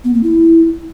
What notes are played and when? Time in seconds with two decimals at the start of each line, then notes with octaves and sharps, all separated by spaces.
0.04 B3
0.14 A#3
0.23 E4